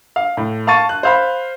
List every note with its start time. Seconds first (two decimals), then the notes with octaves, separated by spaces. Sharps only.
0.16 F5
0.37 A2
0.67 F5 A5 C#6 A6 D#7
0.89 F#6
1.03 C5 F5 B5